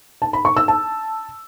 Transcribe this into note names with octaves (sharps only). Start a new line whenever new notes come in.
A5
B5
C#6
E6
A5